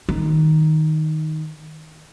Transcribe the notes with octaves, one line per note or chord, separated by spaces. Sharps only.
D#3